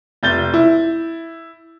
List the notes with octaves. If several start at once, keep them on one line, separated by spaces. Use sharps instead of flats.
F1 G6 A6 G7
E4